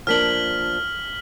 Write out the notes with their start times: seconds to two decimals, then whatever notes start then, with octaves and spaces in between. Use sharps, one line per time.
0.07 F3 A#3 D4 F6 B6 F#7